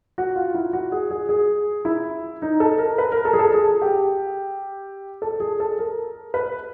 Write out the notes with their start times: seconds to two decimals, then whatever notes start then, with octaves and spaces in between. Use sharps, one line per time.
0.18 F#4
0.36 F4
0.54 E4
0.73 F#4
0.92 G#4
1.11 G#4
1.29 G#4
1.85 E4
2.42 D#4
2.60 A4
2.78 A#4
2.98 B4
3.12 A#4
3.25 A4
3.33 G#4
3.39 A4
3.54 G#4
3.82 G4
5.22 A4
5.40 G#4
5.60 A4
5.79 A#4
6.34 B4